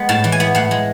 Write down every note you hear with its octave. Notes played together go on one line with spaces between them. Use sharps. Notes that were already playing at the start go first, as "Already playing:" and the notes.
Already playing: G#3 B3
A2 A5
E3
G#5
B3
A2 F#5
G#3